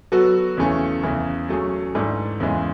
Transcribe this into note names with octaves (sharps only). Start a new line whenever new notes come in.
F#3 B3 F#4 A4
E2 C#3 E3 A3 C#4
E2 C#3 E3
F#3 A3 C#4 G#4
G#2 E3 A3 D4
E2 C#3 E3 G#3